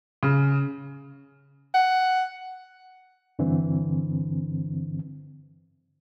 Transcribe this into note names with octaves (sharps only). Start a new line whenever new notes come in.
C#3
F#5
G2 D3 E3 C4